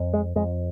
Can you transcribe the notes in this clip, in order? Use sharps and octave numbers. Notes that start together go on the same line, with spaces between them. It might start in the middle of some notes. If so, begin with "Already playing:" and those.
Already playing: F2
G#3
F2 G#3